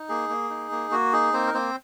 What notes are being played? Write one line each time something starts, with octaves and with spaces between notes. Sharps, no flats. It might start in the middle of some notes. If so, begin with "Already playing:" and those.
Already playing: D#4
A#3 G#4
A#3
D#4
A#3
A#3 F#4
D#4 G#4
A#3 C4 C5
A#4
A#3 C4 C5